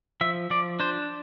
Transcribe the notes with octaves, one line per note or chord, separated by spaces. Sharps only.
F3 E5
F3 D5
D4 C5